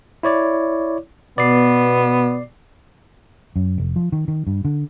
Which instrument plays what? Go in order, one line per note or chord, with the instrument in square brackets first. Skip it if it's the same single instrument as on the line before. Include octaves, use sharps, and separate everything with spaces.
[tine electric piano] E4 C#5 D5
[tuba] B2 [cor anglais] B3 [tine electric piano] D5 C7
[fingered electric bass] F#2
F1
F3
D#3
D#3
G2
D3